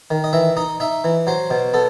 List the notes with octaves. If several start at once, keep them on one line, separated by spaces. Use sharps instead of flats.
D#3
D#5
E3 E5
D#4 D#5
D#4 E5
E3
F#3 C5
B2
B3 A4